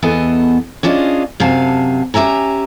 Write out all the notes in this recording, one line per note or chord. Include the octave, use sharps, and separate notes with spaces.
E2 B3 A4 D#5 G#5
C#4 D4 F4 G#4 D#5
F#2 C3 F5 G#5 A5
C#4 G4 E5 G#5 A#5